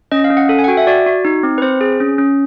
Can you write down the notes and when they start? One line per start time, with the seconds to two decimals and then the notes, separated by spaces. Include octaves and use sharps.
0.12 C#4 D#5
0.24 F5
0.30 C#4
0.37 F#5
0.49 A4
0.59 G#5
0.64 F#5
0.68 F#4 G5
0.77 E5
0.87 F#4 D5
1.06 F#4
1.25 D#4
1.43 C4
1.58 B4
1.62 C4 C5
1.81 G#4
2.00 C#4
2.18 C#4